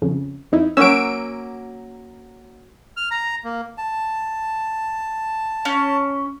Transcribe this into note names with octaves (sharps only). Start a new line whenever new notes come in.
F2 C#3
F2 D#4 E4
F#3 A#3 C#4 E6 D7
F6
A#5
A#3
A5
C#4